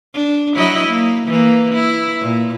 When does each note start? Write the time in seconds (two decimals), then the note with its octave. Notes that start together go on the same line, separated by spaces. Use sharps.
0.14 D4
0.55 F#3 E4 D#5
0.88 A#3
1.28 E3 A#3
1.74 E4
2.21 A#2